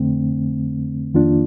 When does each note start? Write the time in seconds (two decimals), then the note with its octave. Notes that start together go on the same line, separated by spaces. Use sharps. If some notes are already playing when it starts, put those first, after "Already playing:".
Already playing: F2 D3 A3 C4
1.14 F2 D#3 A#3 D4 F4